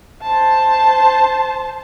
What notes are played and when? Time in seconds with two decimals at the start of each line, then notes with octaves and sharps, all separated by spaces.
0.22 C5 A5